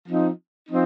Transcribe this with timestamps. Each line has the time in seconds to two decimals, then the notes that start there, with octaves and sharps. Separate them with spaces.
0.08 F3 C4 D#4
0.69 F3 C4 D#4